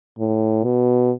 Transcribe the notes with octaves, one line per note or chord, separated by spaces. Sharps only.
A2
B2